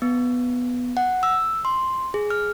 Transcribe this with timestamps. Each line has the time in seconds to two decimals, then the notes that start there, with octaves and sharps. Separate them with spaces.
0.02 B3
0.97 F#5
1.23 E6
1.65 C6
2.14 G#4
2.30 F6